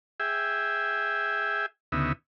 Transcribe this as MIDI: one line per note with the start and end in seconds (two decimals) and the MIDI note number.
0.20 1.66 68
0.20 1.66 76
0.20 1.66 79
1.92 2.12 38
1.92 2.12 49
1.92 2.12 59
1.92 2.12 63
1.92 2.12 76